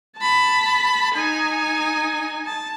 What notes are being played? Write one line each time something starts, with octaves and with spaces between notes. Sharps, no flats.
A5 B5
D#4 G#5
A5